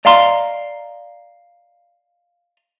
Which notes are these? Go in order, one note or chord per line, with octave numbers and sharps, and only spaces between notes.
D5 D#5 F5 A#5 C6